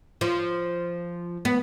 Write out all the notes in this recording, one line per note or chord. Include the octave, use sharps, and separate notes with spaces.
F3
B3